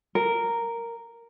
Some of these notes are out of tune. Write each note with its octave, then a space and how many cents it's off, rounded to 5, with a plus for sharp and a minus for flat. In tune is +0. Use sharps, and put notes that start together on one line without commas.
A#4 -5